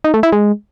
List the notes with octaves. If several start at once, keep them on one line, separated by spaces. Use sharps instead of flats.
D#4
A3
E4
G#3